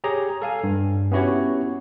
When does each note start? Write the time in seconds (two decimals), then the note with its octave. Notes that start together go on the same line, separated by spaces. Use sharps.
0.04 G4 G#4 C#5 A#5
0.42 A4 F5 G#5
0.64 G2
1.12 B3 C#4 E4 F#4 G4 C#5